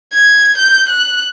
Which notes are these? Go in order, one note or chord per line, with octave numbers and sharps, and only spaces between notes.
G#6
G6
F#6